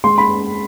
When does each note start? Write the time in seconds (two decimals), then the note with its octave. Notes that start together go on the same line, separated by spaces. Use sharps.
0.04 G#3 C6
0.18 B5